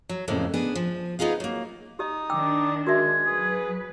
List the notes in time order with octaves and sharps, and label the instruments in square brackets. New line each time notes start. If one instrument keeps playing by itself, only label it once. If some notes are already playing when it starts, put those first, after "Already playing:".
[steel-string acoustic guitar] F#3
F2 A2 C#3 F#3 A#3
B3 D4 G#4
F3
B3 D#4 F4 G#4 F5
F#3 A#3
[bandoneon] D#4 D#6 [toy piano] G4 D#5
[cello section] D#3 D4 [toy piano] G5 E6 [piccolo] D6
[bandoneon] G#3 [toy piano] F#4 A#4 E5 [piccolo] G#6
[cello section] F#3 B4 [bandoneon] G#4